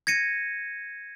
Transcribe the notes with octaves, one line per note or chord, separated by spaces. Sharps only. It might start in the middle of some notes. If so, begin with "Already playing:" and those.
G#6 A#6 C#7 D#7